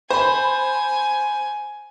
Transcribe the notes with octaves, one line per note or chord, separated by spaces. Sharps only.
C5 G#5 B5